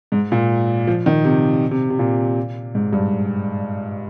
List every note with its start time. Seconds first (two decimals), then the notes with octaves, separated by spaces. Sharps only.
0.12 G#2
0.32 A#2
0.87 F3
1.06 D#3
1.25 C3
1.71 C3
1.90 C3
1.99 A#2
2.75 G#2
2.93 G2